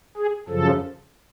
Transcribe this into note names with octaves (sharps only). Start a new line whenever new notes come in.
G#4
F#2 C#3 F3 A4